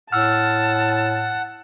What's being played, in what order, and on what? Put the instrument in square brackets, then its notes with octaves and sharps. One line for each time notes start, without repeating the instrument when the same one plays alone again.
[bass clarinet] A2 [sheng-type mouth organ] F#5 [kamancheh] A5 [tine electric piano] E6 F6